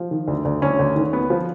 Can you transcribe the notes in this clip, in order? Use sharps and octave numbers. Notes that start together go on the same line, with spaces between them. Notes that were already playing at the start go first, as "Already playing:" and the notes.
Already playing: F3
D#3
D2
D2
D2 C#4
D2
D#3
B3
F3